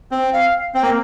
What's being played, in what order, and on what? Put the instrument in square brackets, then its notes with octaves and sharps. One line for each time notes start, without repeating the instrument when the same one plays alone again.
[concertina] C4
[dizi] F5
[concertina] C4 [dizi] G5
[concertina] A#3